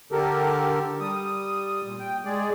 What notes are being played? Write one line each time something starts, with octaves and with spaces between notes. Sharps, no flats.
D3 G4 A4 A#4
G3 D#6
A#2
G5
G#3 G#4 D5